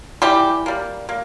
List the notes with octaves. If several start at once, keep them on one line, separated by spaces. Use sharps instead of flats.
E3 G3 G4
G3 A#3
A#3